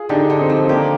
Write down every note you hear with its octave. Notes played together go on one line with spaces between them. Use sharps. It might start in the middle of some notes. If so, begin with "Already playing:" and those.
Already playing: F4 G#4
D3 D#4 G4
D3
C4 D#4
F3
C4
A#3 D4 G4